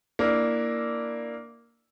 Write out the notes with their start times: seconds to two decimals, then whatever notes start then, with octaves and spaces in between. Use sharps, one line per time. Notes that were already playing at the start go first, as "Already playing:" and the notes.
0.19 A#3 D4 E4